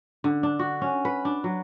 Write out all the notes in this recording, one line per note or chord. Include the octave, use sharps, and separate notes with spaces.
D3
D4
F#4
C#4
B4
D4
F#3